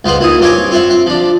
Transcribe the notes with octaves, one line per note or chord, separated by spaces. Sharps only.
C#2 B3 F4 C5 F#5
D#2 E4 F4 D#6
G2 C4 G4 C#5 G#5
C4 F4 E5 F#5
C4
F3 D4